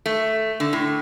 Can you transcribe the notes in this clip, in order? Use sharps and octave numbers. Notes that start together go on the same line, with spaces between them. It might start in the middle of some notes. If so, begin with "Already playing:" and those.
A3
D3
A2